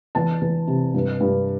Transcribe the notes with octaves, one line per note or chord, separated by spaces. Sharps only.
E2 A5
E2
C3
G2
G2